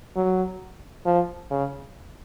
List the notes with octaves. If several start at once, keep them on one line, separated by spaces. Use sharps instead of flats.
F#3
F3
C#3